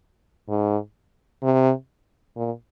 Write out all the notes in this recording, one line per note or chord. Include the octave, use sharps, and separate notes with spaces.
G#2
C3
A#2